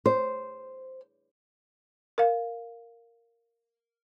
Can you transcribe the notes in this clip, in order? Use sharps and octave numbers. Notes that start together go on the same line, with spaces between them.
C5
A#4 F5